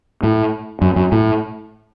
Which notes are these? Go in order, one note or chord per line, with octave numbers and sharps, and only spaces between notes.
A2
F#2
F#2
A2